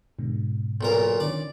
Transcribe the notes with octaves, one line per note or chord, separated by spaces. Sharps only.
G#2 B2 D3
B1 A#2 A#4
D3 D#3 C#4 D5